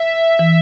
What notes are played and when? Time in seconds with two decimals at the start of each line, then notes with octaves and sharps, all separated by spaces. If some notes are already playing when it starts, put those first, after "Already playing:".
Already playing: E5
0.39 E3